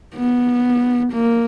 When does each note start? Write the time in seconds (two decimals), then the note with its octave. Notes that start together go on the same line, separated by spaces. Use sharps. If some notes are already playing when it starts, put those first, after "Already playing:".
0.15 B3
1.13 A#3